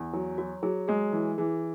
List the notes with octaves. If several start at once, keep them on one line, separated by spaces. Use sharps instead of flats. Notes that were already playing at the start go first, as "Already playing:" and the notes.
Already playing: E2
F#3
F#3 F#4
F#3 G#4
G#3 G#4
E3
E3 G#4